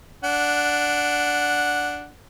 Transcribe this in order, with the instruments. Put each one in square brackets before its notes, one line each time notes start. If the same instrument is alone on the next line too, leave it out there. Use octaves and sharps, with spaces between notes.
[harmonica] D4 F#5